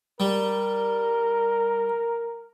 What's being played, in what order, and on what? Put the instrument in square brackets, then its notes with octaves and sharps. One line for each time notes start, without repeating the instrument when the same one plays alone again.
[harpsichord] G3 [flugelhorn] A#4